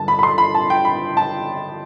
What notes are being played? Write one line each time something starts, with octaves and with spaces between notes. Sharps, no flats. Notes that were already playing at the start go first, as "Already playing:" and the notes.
Already playing: G2 D3 G3 A5
B5
B5
C6
B5
A5
G5
B5
A5